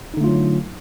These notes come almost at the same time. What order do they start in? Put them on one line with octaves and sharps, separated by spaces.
D#4 D3 A3 F4 F#3